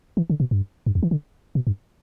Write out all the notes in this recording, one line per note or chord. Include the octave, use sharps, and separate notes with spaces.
E3
D3
B2
G2
G2
E2
E3
D3
B2
G2